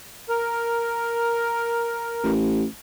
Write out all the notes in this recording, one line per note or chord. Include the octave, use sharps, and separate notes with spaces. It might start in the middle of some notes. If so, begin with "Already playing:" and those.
A#4
A1